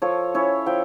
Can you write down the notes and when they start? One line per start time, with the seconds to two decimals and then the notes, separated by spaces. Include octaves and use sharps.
0.02 F3 A4 C#5
0.34 C#4 E4 C#5 E5
0.66 F3 E5 G5